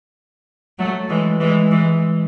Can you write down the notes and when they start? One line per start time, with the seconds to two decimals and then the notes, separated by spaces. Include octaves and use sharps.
0.79 F#3 A3
1.09 E3 G#3
1.40 E3 G#3
1.72 E3 G#3